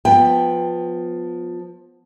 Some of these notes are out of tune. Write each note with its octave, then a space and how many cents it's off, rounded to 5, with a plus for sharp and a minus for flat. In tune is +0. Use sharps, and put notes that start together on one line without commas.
F3 +20 B3 +0 G5 +20